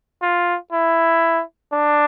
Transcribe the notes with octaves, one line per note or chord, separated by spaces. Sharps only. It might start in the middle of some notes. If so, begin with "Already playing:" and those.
F4
E4
D4